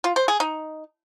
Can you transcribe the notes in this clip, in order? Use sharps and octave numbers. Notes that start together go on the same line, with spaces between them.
F4
C5
G#4
D#4